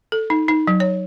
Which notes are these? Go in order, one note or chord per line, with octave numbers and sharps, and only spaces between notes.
A4
D#4
D#4
F#3
C#5